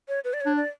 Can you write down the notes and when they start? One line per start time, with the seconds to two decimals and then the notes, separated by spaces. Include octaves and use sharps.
0.08 C#5
0.24 B4
0.33 D5
0.41 C#5
0.46 D4
0.57 D5